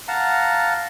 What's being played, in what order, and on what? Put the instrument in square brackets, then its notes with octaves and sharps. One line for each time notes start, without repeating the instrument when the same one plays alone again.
[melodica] F5 F#5 A5 A#5